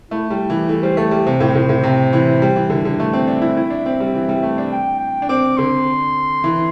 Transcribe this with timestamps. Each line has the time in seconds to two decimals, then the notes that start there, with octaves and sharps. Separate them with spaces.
0.11 A3 E4
0.30 G3 E4
0.50 E3 G4
0.69 E3 A4
0.83 G3 C5
0.97 A3 A4
1.11 G3 G4
1.26 C3 C5
1.40 A2
1.55 A2
1.69 A2
1.83 C3
2.13 E3
2.42 G3
2.56 E3
2.70 D3
2.85 D3
3.00 A3
3.13 C4
3.27 D4 E5
3.42 E4
3.56 E4 E5
3.70 D4
3.86 C4
4.00 G3
4.14 E3
4.29 G3
4.43 A3
4.58 D4
4.72 G5
5.00 G5
5.22 D4
5.29 C4 D6
5.57 D3 C6
6.44 E3